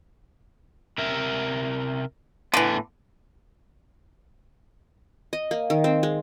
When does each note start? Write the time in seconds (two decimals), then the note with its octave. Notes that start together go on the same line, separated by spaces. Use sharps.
0.98 C3 A#4 E5
2.54 A2 D3 E3 B3
5.33 D#5
5.51 A#3
5.70 D#3
5.84 C4
6.03 G#3